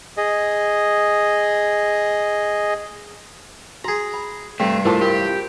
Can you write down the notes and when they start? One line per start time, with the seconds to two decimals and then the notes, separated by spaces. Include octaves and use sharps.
0.17 G#4 D#5
3.84 F#4 G#4 A#5 C6
4.14 B5
4.60 G2 C3 A3
4.85 E3 A3 F4 A#4 C5 A5
5.01 G4 A#4 C#6